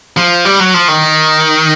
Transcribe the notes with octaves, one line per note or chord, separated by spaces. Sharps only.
F3
G3
F#3
F3
D#3